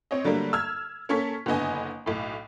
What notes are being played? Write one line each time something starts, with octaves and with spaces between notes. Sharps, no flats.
C4 C#5 D#5
D3 F#3 G3 A3 A#3
E6 F6 G#6
A#3 C#4 A4 C#6 B6
F#1 D3 B3 D#5 G#5
B1 A2